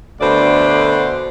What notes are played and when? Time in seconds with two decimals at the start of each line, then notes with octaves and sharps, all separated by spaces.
0.20 D2 B2 D3 C5 D5